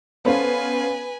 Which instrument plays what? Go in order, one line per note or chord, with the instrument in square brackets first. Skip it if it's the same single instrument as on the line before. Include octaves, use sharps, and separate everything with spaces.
[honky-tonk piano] B3 C#4 [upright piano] A4 C5 F5 [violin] B4 G#5